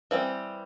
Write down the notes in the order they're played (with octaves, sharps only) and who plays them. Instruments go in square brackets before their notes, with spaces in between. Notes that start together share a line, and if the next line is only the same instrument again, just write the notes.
[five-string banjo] E3 G3 C4